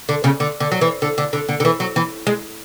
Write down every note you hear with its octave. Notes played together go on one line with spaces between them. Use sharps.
D3
C#3
D3
D3
F#3
E3
D3
D3
D3
D3
D3
E3
F#3
E3
G#3